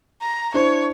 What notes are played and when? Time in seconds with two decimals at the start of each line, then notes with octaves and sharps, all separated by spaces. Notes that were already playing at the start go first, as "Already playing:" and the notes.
0.21 A#5
0.54 D4 E4 C5 C#5